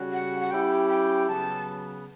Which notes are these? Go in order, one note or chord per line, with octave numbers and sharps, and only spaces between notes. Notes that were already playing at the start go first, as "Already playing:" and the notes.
Already playing: C#3 G3 C#4 F#4
F#5
F#5
G3 C#4 E4 G4 G5
G5
C#3 F#3 B3 A5